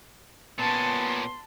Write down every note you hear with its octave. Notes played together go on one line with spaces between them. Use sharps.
A#2 B3 C#4 A5 C6